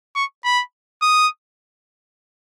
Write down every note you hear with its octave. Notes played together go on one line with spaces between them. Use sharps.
C#6
B5
D#6